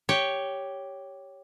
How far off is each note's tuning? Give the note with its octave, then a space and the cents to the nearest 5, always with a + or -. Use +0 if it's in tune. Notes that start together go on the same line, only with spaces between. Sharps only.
G4 +0 C#5 +5